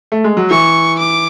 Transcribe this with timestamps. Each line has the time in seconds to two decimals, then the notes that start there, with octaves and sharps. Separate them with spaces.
0.12 A3
0.24 G#3
0.37 F#3
0.50 E3 C#6
0.99 D6